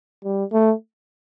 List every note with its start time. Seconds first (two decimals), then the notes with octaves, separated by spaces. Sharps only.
0.24 G3
0.52 A3